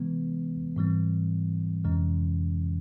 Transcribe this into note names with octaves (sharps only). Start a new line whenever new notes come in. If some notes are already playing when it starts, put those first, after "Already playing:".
Already playing: C3 E3 G#3 B3
G#2 E3 G3 C4
F2 C3 E3 G#3 C#4